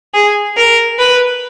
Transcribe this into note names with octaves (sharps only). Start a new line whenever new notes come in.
G#4
A#4
B4